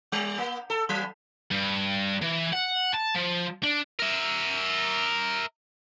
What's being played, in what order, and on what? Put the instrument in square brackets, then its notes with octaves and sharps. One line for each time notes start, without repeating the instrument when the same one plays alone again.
[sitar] G3
A#3
A4
F#3
[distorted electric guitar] G2
E3
F#5
A5
F3
D4
A#4 E5